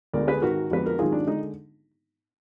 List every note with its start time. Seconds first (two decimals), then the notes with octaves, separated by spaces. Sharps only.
0.13 D2 D3 G#3 B3 A#4 D5
0.27 G#4 B4
0.42 G#1 G#2 D#3 F#4 A#4
0.71 F2 D3 G#3 B3 B4
0.86 A#4
0.99 G#1 G#2 D#3 F#3 F4 G#4
1.12 D4
1.27 D3 G#3 D#4